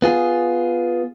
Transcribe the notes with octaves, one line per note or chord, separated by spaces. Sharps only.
B3 F4 G#4